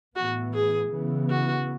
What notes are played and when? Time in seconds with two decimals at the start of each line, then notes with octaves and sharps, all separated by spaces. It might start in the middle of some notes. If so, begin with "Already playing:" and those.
0.16 A2 E3 B3 F#4
0.53 G#4
0.92 C#3 E3 B3
1.30 F#4